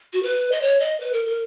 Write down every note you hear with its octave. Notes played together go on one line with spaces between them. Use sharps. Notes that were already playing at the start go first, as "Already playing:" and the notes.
F#4
B4
D#5
C#5
D#5
B4
A#4
A#4